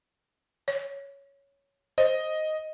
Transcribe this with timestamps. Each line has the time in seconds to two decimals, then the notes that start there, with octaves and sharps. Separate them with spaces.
0.68 C#5
1.98 C5 D#5